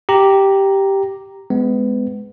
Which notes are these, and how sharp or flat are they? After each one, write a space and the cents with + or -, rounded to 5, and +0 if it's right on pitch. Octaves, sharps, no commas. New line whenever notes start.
G4 -5 A#5 +0
G#3 +10 B3 +25